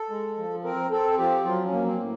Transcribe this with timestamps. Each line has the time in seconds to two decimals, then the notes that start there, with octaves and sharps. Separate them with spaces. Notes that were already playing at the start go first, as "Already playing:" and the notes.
Already playing: A4
0.10 G#3
0.38 F3
0.64 C4 A#4
0.91 C4 A4
1.18 F3 G4
1.45 F#3 F4
1.65 C#4
1.72 A#3
1.86 C4
1.99 A2